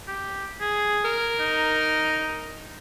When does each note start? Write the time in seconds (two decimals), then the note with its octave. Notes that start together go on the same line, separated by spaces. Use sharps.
0.08 G4
0.61 G#4
1.04 A#4
1.40 D#4